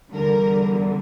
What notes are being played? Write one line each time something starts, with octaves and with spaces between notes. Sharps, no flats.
E2 D3 G3 A#4